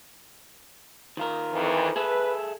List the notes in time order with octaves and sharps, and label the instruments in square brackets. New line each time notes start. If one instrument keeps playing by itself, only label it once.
[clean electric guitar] D#3 F4 A#4
[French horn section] F2 E3
[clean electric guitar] G#4 A4 E5 [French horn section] B4